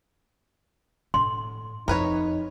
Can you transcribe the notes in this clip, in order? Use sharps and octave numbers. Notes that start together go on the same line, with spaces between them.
A2 C6
F2 D#4 A#4 B4 C#5